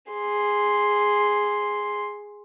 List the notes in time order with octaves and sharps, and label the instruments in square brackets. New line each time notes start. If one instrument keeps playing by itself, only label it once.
[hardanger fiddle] G#4 C6